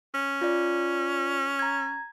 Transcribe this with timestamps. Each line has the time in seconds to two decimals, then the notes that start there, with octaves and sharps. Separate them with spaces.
0.14 C#4
0.41 F4 D5
1.59 A#5 G#6